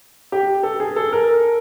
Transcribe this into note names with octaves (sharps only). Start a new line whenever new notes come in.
G4
A4
G#4
A4
A#4